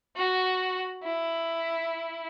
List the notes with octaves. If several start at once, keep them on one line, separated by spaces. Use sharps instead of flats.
F#4
E4